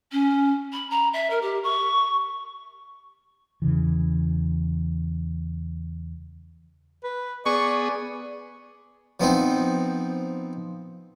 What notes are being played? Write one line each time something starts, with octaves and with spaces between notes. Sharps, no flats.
C#4
B5
A#5
E5
A#4
G4
C#6
E2 C#3 E3
B4
B3 G#4 D5 C#6
F3 B3 C4 D#4